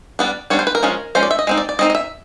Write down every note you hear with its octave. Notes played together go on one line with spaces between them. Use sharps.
G3 B3 D4
G3 B3 D4 C#5
C5
B4
A#4
F3 G#3 C#4
F3 G#3 C#4 C5
D5
E5
D#5
G#3 C4 D#4
D5
D5
G#3 C4 D#4 D#5
D#5
E5